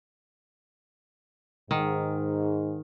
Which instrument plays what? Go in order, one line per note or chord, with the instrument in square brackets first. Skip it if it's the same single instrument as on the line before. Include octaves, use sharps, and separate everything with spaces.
[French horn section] G#2 [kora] D#3